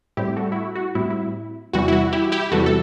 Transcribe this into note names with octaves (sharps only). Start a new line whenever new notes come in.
A2 G3 C4 E4 G4
F#4 A4
E4
F#4
F#4
A2 G3 C4 E4
E4
E2 C3 E3 G3 F#4
E4
F#4
E4 G4
E4 G4
E2 C3 E3 G3 F#4 A4
A4